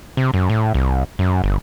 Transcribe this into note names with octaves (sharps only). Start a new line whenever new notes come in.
C3
F#2
A2
C2
F#2
G1